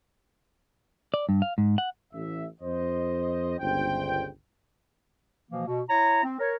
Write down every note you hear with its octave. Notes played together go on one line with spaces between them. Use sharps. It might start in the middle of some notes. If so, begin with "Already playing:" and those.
D5
G2
F5
G#2
F#5
A1 E5
F2 C5 D#5
G1 C#2 C5 G5
B2 E3 F3 A#3
B2
E4 C#5 A#5
C4
A#4 C#5